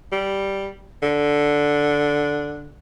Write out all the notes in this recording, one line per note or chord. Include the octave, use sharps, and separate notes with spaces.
G3
D3